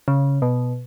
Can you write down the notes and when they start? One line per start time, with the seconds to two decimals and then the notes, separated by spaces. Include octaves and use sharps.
0.08 C#3
0.42 B2